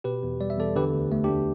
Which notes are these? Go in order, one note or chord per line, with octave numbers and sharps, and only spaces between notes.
B2 G4 B4
E2
G3 D5
E5
E2 A4 D5
D3 G4 B4
D2
A3
D4 G4
D2